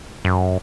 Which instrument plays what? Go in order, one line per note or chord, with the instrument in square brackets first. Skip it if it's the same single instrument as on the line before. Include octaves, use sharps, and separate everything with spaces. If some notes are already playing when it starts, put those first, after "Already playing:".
[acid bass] F#2